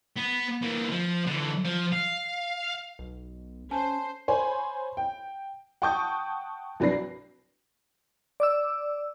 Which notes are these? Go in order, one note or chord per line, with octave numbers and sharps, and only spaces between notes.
B3
E3 A#3
F3
D3 E3
F3
F5
B1
C#4 C5 G#5 A5
C5 C#5 G#5 B5
G5
F#5 G5 A5 C#6 D#6 G6
C2 F#3 D4 B4 A#6 C7
D5 D6 E6